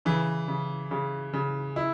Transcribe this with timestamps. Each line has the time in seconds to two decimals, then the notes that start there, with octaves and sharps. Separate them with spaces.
0.05 C#3 E3
0.48 C#3
0.91 C#3
1.33 C#3
1.76 E4